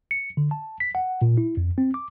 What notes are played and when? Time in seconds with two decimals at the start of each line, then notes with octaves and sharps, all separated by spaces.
0.11 C#7
0.37 D3
0.51 A5
0.80 B6
0.95 F#5
1.22 A#2
1.38 E4
1.57 F2
1.78 C4
1.94 D6